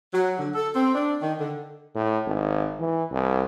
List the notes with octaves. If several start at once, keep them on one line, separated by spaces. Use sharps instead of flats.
F#3
D3
A4
C4
D4
D#3
D3
A2
G#1
E3
C2